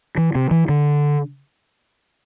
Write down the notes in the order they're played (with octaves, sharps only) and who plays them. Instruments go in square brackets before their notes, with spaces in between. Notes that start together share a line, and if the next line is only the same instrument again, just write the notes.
[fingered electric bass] E3
C3
E3
D3